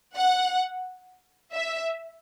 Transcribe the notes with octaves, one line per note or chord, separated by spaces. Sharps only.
F#5
E5